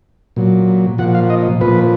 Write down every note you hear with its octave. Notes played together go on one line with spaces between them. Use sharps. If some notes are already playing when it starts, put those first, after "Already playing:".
A#2 F#3
A#2 F3 F#5
F5
D#5
A#2 F3 B4